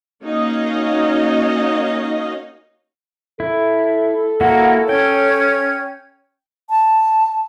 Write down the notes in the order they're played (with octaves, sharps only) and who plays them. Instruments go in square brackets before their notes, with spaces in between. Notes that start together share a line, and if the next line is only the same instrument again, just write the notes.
[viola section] A#3 C#4 D#4 F#4 D#5 F5
[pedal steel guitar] E4 [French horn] A4
[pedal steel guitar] A#3 E4 F#4 [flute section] A#4 F#5
[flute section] C#4 C#5 G#6 [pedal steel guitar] G5
[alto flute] A5